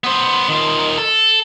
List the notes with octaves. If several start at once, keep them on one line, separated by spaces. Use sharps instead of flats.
B3 C5
D#3 F4
A4